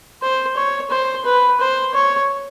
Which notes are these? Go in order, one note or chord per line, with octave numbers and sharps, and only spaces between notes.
C5
C#5
C5
B4
C5
C#5